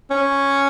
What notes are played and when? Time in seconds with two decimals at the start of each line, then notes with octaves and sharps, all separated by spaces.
0.11 C#4